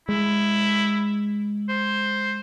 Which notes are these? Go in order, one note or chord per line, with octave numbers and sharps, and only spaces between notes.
G#3 E4
C5